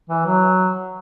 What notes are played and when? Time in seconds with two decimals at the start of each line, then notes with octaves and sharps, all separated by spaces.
0.10 E3
0.26 F#3